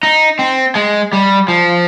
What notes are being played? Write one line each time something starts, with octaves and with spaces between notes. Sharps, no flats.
D#4
C4
G#3
G3
F3